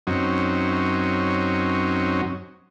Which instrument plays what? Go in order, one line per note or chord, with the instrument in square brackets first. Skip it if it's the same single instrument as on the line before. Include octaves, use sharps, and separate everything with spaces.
[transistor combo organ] F#2 F#3 C4 C#4 D#4